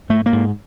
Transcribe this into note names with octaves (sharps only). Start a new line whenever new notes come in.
G#2 A3
A#3
G#2